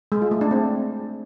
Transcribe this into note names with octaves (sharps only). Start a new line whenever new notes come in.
G#3
F4
A3
D4
C4